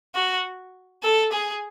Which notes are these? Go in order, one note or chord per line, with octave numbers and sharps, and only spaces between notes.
F#4
A4
G#4